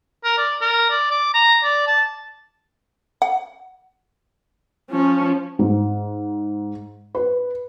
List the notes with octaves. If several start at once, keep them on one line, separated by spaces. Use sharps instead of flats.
A#4
D5
A#4
D5
D6
A#5
D5
A5
F#5
F3 C#4
G#2
B4